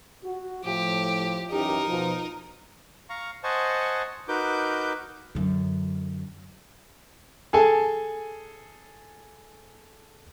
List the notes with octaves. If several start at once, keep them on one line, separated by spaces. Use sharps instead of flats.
F#4
A2 F3 G4
F#2 E3 D#4 G4 A#4
B2 F3
F5 A#5 C#6
C5 D#5 F#5 G#5 A5 C#6
D#4 F#4 A#4 B4 D6 G6
F#2 D3
G#4 A4 G#5 A5